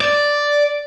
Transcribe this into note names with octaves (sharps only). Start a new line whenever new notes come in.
D5